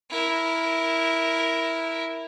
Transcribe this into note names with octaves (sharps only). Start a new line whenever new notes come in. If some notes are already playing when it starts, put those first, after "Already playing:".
E4 A#4